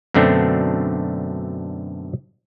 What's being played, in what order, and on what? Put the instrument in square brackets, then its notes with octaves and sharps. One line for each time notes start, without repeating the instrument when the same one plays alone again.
[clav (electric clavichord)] F#2 B2 D3 A3 C4 D4